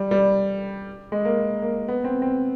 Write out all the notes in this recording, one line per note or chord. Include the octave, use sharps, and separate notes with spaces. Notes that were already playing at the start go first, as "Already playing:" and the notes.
Already playing: G3
G3
G#3
A#3
A#3
B3
C4
C4